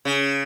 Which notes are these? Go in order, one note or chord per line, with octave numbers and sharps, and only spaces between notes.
C#3